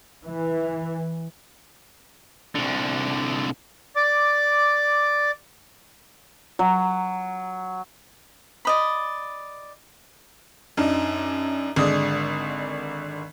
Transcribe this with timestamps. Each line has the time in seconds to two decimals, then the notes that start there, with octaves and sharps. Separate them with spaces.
0.25 E3
2.55 C2 D3
3.96 D5 D6
6.59 F#3
8.65 D5 D#5 B5
10.77 F#2 D4 D#4
11.76 G#1 D3 G#3 D5 D#6